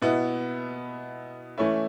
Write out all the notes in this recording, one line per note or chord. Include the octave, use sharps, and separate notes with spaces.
B2 B3 E4
E3 A3 C#4 E4